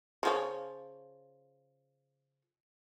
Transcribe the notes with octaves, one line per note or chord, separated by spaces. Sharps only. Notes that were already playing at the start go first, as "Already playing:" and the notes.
C#3 F3 C#4